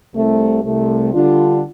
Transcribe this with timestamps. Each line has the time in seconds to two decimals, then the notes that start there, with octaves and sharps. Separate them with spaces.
0.14 C2 C3 A3
0.64 C2 C3 A3
1.13 D3 G3 D4 F4